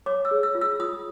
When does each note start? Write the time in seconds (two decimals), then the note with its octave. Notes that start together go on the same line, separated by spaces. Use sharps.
0.06 C#5 D6
0.25 E6
0.31 G#4
0.43 E6
0.55 F4
0.61 E6
0.80 F4 D#6